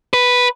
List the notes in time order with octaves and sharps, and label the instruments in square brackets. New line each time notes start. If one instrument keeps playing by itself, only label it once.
[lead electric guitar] B4